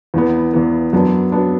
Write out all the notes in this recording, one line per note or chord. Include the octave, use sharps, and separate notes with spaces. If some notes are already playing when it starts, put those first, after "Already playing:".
E2 E3 B3
E2 E3 B3
F#2 F#3 B3 D4
F#3 B3 D4